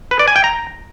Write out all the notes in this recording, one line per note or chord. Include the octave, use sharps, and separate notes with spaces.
B4
D5
G#5
G5
A#5